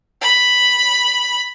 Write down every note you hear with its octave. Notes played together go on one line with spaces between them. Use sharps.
B5